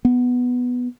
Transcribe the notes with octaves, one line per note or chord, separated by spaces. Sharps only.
B3